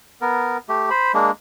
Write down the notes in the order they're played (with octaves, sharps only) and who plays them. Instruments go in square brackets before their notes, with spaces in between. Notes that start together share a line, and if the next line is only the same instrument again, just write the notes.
[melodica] B3 A#4
A3 G4
C5 B5
G#3 A#3 D4